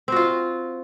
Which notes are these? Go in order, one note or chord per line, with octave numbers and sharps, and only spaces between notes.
C4 F4 F#4